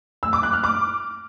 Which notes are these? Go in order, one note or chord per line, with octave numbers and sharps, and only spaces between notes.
E6
D6
F#6
F6
D6